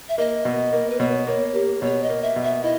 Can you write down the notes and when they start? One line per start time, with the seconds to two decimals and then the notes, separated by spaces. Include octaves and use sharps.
0.09 E5
0.18 A#3 D#5
0.45 B2
0.73 A#3
0.90 B4
1.00 B2 C#5
1.27 A#3 C#5
1.55 A#3 G4
1.82 B2 C#5
2.03 D#5
2.09 A#3
2.23 E5
2.36 B2
2.44 E5
2.63 E4 D#5